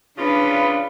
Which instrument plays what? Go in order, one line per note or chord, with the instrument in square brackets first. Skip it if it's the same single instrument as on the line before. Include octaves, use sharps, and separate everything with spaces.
[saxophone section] C#3 F4 [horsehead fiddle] D4 B4